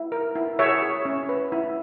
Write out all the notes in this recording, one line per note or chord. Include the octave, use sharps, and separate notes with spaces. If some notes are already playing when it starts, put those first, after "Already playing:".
Already playing: E4
A#4
E4
G#4 C#5 E5
G#4
C#4
B4
E4